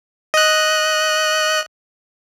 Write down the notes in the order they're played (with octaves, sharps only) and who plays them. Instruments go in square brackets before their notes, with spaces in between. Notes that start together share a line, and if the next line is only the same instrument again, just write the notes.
[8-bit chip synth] D#5 F#6